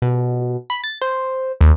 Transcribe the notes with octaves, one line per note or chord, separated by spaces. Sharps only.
B2
B5
A6
C5
D#2